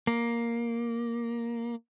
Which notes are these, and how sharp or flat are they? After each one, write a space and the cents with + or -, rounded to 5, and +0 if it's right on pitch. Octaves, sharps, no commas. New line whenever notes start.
A#3 +5